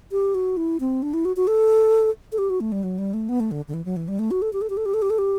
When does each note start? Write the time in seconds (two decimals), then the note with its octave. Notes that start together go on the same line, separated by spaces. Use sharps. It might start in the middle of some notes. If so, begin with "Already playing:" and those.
0.12 G4
0.35 F#4
0.57 E4
0.80 C4
1.02 D4
1.14 E4
1.25 F#4
1.36 F#4
1.47 A4
2.32 A4
2.38 G4
2.50 F#4
2.60 A3
2.72 G3
2.83 F#3
2.98 G3
3.14 A3
3.29 B3
3.40 A3
3.51 D3
3.68 D3
3.74 E3
3.85 F#3
3.96 E3
4.08 G3
4.19 A3
4.31 F#4
4.42 A4
4.53 G4
4.62 A4
4.70 G4
4.77 A4
4.86 G4
4.94 A4
5.02 G4
5.10 A4
5.18 G4